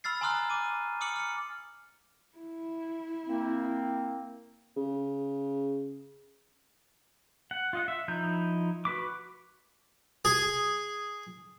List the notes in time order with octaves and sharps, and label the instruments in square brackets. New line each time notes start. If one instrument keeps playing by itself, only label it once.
[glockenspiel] B5 E6 F6 A6 C7
G#5 A#5 C6 D#6 F6 F#6
D6 D#7
D6 D#6 F6 C#7 F#7
F6 C#7
[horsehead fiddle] E4
[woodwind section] A#3 C4
[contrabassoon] C#3
[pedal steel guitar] F#5
F4 D#5 F#5
E5
F3 D#4 E4 G6
F#4 B4 B5 D6
[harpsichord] G#4